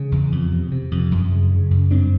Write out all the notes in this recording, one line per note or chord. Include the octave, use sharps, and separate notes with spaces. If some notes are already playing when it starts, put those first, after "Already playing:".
Already playing: C#3 G#3
E2
F2
C3
C3
F2
F#2
C#3
C#3
F#2
G2 C4 D4